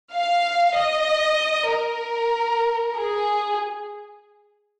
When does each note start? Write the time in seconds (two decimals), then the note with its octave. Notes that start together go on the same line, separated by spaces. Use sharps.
0.13 F5
0.76 D#5
1.71 A#4
2.97 G#4